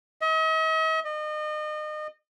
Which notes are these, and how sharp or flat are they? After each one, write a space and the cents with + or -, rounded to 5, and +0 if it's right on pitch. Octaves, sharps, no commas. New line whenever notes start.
D#5 +45
D#5 -35